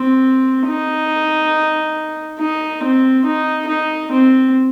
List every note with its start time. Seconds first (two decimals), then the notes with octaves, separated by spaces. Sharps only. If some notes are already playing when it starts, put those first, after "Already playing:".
Already playing: C4
0.67 D#4
2.39 D#4
2.83 C4
3.26 D#4
3.68 D#4
4.12 C4